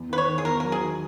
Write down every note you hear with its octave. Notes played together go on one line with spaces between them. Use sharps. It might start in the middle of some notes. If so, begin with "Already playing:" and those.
Already playing: E2
D#3 B4
C#5
D#3
G#4
E2 A#4
F#3 A#4
G#4
D#3